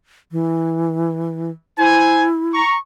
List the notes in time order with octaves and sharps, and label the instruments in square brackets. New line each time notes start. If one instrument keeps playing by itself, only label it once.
[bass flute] E3
[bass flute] E4 [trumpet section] C5 G#5
[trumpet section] A#5 C#6